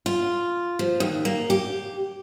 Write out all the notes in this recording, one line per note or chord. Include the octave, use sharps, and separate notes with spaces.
F4
F3
D#2
A#3
G4